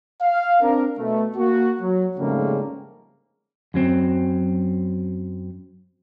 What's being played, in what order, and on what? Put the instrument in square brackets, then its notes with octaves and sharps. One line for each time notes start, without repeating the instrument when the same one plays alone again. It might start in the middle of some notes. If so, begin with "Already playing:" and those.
[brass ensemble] F5
C4 D4 A#4
B2 A3
A#3 F#4
F#3
F2 G#2 C#3 G3 A3 A#3
[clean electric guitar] F#2 F#3 C4